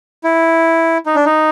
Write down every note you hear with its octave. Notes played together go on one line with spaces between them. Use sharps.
E4
D#4
D4
D#4